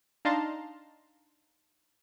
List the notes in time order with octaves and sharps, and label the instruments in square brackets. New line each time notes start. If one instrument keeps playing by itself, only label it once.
[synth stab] D4 D#4 F5 A5 A#5 C6